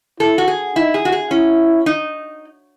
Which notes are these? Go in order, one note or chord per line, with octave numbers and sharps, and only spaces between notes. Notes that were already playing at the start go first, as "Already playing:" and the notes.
E4 A4
F#4
G#4
D#4 E4
G#4
F#4
G#4
C#4 E4
D#4